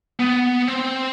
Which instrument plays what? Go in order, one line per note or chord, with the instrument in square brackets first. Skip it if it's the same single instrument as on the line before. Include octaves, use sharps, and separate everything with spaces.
[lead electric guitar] B3
C4